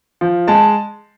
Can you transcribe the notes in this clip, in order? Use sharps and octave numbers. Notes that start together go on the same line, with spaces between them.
F3
G#3 A5